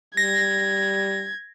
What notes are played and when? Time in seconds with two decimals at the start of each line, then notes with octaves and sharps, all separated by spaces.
0.17 G3 G#6 A#6